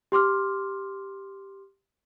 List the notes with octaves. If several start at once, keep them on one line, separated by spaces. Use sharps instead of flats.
G4 C6 D6 F6